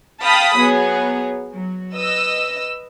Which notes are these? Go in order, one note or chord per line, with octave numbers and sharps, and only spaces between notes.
F5 G5 A5 B5 D#6
F#3 B3 G#4
F#3
B4 D#5 E6